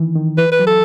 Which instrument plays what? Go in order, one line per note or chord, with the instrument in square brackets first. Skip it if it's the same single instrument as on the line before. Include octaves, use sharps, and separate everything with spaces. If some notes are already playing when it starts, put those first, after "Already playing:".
Already playing: [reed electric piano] D#3 E3
D#3
[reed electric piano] E3 [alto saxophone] B4
[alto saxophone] B4
[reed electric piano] F#3
[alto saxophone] A4